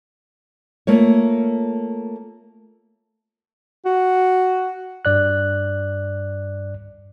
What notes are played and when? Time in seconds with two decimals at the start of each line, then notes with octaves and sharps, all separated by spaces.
0.87 A3 A#3 F4 C#5
3.86 F#4
5.05 G2 D5 F#6